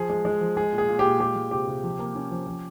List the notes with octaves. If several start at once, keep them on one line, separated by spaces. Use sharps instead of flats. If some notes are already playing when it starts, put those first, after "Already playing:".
Already playing: F3 G#4
G#3
G#3
F3
G#3 G#4
A#2
G#4
A#2
G4
A#2
G#3 G4
G#3
C3 G4
C3
F3
A#3
C#4
F3
F3